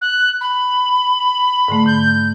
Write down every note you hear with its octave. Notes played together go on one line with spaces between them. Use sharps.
F#6
B5
G#2 D3 A3
G6